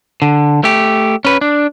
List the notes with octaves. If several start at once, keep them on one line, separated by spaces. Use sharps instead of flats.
D3
A3 G4
C#4 B4
D4